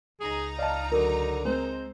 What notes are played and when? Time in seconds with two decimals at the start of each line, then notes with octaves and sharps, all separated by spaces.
0.20 C#2 D#4 G#4 A#5
0.59 D5 D#5 F5 A5
0.92 D3 F#3 A#4
1.45 G#3 C4 C5